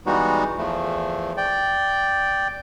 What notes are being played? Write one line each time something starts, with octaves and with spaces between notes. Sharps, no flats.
E3 G3 G#3 B3 D#4 F#4
E2 F3 A3
D5 G5